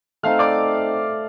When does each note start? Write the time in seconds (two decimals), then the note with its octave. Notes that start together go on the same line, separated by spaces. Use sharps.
0.23 A3 C4 D#4 A4 F5 F6
0.39 D5 D6